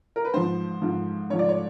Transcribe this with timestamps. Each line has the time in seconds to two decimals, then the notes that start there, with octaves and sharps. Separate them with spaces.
0.16 A#4
0.25 B4
0.34 G#2 F3 C5
0.82 G#2 F3
1.30 G#2 F3 C#5
1.39 D5
1.49 C#5